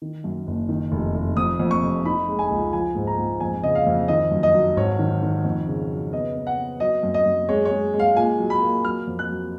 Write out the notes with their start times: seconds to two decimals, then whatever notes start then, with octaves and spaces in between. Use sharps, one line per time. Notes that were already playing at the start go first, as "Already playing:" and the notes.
0.02 D#3
0.24 F#2
0.47 F#1
0.69 D#3
0.92 F1
1.15 F1
1.37 F2 D#6
1.60 F2
1.71 C#6
1.82 F1
2.05 D#4 B5
2.28 G#3
2.39 G#5
2.50 C#2
2.73 F3 G#5
2.95 G#2
3.07 A#5
3.18 G#2
3.40 F2 G#5
3.63 C#3 D#5
3.75 F5
3.87 F2
4.08 D#3 D#5
4.31 F#2
4.43 D#5
4.54 F#3
4.76 G#1 C#5
4.99 D#3
5.22 D#3
5.45 F2
5.68 C#3
5.91 F#3
6.13 B3 D#5
6.35 B3
6.47 F#5
6.58 B3
6.80 F#3 D#5
7.03 F#2
7.14 D#5
7.26 F#2
7.49 G#3 C#5
7.65 C#5
7.71 G#3
7.94 G#3
7.99 F5
8.16 A#2 G#5
8.39 F#3
8.50 B5
8.62 A#3
8.85 F#3 F6
9.07 F2
9.19 F#6
9.30 F#3